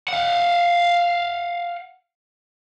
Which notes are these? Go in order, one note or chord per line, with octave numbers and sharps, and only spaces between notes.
F5 F#5